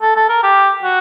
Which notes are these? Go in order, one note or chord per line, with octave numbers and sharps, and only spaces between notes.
A4
A4
A#4
G4
F#4